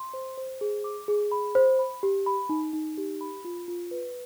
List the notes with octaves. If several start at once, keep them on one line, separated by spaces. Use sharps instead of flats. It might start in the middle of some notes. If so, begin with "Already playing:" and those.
Already playing: C6
C5
C5
G#4
D6
G#4
B5
C5
B5
G4
B5
D#4
D#4
G4
B5
F4
F4
B4